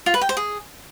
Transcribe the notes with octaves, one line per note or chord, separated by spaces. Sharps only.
F4
B4
G5
C5
G#4